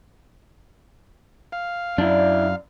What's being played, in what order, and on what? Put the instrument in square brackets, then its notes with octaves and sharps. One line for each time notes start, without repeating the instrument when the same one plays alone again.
[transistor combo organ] F5
[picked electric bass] F#2 [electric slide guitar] D4 E4 [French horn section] D5